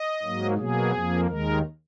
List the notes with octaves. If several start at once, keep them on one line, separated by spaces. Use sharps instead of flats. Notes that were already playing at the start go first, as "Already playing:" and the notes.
Already playing: D#5
G#2 F#3 A#3
B2 F#3 A#3 G#4
F2 F3 A#3
D#2 D#3 G#3 A#4